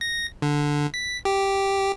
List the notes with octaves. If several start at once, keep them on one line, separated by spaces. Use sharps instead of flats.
A#6
D3
B6
G4